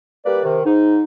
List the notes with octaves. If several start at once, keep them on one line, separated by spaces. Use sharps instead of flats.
G3 A#3 B4 D5
C3 D#3
G#2 D#4